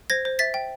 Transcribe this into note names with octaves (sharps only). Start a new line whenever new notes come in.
C5 G#6 A#6
C5
E5 A6 B6
G5